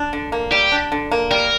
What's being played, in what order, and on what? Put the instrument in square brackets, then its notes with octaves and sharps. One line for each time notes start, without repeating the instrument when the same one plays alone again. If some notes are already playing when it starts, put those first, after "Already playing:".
Already playing: [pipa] D4
D3
A#3
[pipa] G3 [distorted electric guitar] G4
[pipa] D4
D3
A#3
[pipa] G3 [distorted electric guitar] A#4